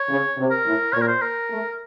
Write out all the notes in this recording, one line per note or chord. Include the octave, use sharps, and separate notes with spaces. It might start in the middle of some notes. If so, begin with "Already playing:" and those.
Already playing: C#5
C#3
C3
A#4
A2
A#2 C#5
A#4
C5
A#4
A3